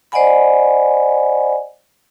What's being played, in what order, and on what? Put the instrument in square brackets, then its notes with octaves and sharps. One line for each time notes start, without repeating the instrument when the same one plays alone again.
[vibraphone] C5 D5 D#5 F#5 G#5 B5